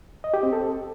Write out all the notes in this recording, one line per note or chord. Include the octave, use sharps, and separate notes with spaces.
D#5
G4
C4
A4